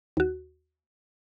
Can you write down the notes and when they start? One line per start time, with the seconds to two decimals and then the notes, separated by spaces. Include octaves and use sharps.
0.17 D#2 F#4